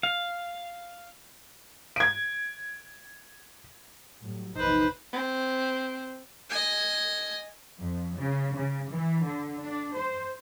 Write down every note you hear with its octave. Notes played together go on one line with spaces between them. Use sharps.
F5
G#6 D7
A2 F#3 G3
A#1 E2 C3 D#4 B4 C5
C4
D#5 G#5
F2
C#3
C#3
E3
D3
D4
C5